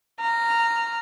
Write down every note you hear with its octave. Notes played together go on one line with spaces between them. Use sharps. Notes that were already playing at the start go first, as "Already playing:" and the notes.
A#5 F6